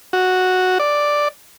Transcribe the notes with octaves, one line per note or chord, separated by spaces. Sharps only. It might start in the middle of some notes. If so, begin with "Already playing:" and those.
F#4
D5